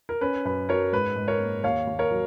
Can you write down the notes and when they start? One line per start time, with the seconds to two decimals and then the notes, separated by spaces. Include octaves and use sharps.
0.09 A#4
0.21 C#4 B4
0.45 F#2 B4
0.69 F#3 A#4 C#5
0.92 G#2 B4
1.16 G#2
1.28 A#4 C#5
1.40 A#3
1.63 D#2 C#5 F5
1.87 D#2
1.99 A#4 C#5
2.11 F#3